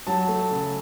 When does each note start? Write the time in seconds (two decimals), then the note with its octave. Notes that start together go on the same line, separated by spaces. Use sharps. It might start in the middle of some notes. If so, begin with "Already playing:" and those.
0.07 F#3 A5
0.29 A3
0.51 C#3